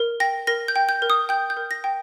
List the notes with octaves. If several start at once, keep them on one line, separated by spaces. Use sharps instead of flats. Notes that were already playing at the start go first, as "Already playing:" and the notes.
Already playing: A#4
G5 A#6
A#4 A#6
G6
G5
G6
A#4
D#6
G5 G6
G6
A#4
A#6
G5